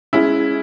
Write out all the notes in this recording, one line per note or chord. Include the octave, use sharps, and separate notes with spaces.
G#3 C#4 E4